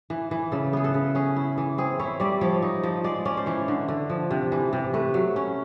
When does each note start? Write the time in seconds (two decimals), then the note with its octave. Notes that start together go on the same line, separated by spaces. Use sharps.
0.10 E3
0.31 E3
0.52 C#3 A4
0.73 B3 G#4
0.84 A4
0.94 C#3
1.15 C#4 G#4
1.36 E4
1.58 E3
1.78 C4 G#4
2.00 E4 C#5
2.20 G3 D5
2.41 F3 C#5
2.62 D#4
2.83 F3
3.04 G#3 D5
3.25 C#4 D5
3.37 C5
3.46 E3 C#5
3.68 D3
3.88 D3
4.10 F3
4.31 C3
4.52 E3
4.73 C3
4.94 A3 B4
5.14 F#3
5.36 C#4